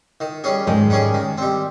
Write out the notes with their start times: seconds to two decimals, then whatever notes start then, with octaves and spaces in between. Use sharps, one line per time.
0.20 D#3
0.44 G3 C#4 G#4
0.67 G#2 D#3 G#3
0.90 G3 C#4 G#4
1.14 D#3
1.38 G3 C4